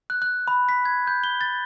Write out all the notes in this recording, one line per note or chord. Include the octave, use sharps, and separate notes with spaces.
F#6
F#6
B5
B6
G#6
G6
G7
A6